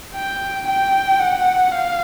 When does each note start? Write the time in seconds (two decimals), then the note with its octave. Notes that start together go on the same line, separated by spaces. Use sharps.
0.15 G5
0.67 G5
1.20 F#5
1.72 F5